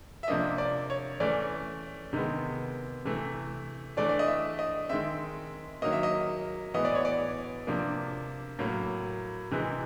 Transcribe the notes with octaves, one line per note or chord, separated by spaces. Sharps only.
E5
C3 F3 A#3 D4 D#5
D5
C#5
E3 A3 C#4 D5
C3 D#3 G#3 B3
C3 E3 A3
E3 A3 D4 D5
D5
D#5
E5
D#5
D#3 G#3 C4 E5
D#3 F#3 A#3 D#5
E5
D#5
A2 E3 G#3 B3 D#5
D5
C#5
D5
C3 F3 A#3 D4
A2 F#3 A#3
C3 E3 G#3